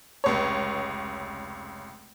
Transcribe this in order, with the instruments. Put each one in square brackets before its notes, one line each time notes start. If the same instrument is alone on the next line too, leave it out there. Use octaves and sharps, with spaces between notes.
[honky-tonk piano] F1 C#2 C#5